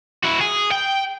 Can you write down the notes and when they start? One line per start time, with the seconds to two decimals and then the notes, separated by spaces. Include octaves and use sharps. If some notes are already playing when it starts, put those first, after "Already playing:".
0.24 E4 F#4
0.41 G#4
0.72 G5